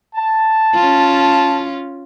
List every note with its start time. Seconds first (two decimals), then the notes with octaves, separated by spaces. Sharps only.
0.16 A5
0.74 C#4 F4